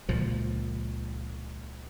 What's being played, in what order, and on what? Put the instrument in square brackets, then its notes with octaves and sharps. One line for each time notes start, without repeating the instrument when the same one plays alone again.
[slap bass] C#2 A#2 F3